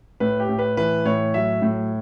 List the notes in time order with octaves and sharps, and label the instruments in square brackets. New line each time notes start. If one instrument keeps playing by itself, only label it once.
[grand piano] A2 B4
G4
A2
B4
E3 B4
A2 C#5
F#3 E5
A2